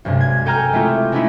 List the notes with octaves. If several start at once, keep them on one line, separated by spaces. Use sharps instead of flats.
B1 G2 C3 G#3
G#6
A4 G5 G#5 A#5 F6 G6
G#3 A3 C4 E4 F4 G4
G#3 A3 B3 C#4 D#4 E4